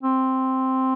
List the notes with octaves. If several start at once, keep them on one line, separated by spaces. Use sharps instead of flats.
C4